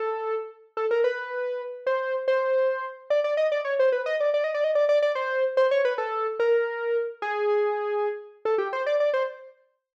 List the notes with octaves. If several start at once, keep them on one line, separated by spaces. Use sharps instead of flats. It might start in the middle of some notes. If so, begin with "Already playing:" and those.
Already playing: A4
A4
A#4
B4
C5
C5
D5
D5
D#5
D5
C#5
C5
B4
D#5
D5
D5
D#5
D5
D#5
D5
D5
D5
C5
C5
C#5
B4
A4
A#4
G#4
A4
G4
C5
D5
D5
C5